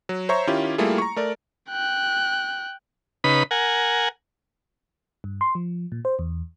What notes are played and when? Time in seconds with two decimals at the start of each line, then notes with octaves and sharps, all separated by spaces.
0.09 F#3
0.29 C5 C#5 E5 A#5 C#6
0.47 D#3 C#4 E4 F4 G4
0.78 G3 A3 A#3 E4 F4 G#4
0.98 A#5 C#6
1.16 A3 A#4 D5
1.70 G5 F#6
3.24 C#3 D#4 B4 B5
3.51 A#4 F#5 G#5
5.24 G2
5.41 C6
5.55 F3
5.92 A#2
6.05 C5
6.19 E2